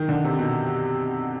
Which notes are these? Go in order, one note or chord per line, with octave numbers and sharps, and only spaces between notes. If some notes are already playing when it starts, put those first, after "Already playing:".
Already playing: D#3
D3
C3
B2